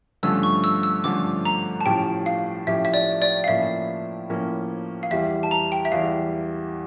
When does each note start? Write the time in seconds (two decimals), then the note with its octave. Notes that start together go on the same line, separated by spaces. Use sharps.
0.23 G2 D3 F3 A3 C#4 E6
0.43 C#6
0.64 E6
0.83 E6
1.04 G2 D3 F3 A3 C#4 D6
1.45 A#5
1.81 A5
1.86 A2 F3 C#4 G4 G5
2.26 F5
2.67 A2 F3 C#4 G4 E5
2.85 E5
2.94 D5
3.22 D5
3.44 F5
3.48 A2 F3 A#3 C#4 E4 E5
4.30 A2 F3 A#3 C#4 E4
5.03 F5
5.11 E2 E3 G3 E5
5.43 A5
5.51 A#5
5.72 G5
5.85 E5
5.92 E2 E3 G3 F5